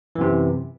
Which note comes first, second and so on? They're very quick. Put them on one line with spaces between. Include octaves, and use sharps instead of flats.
E3 F#2 C3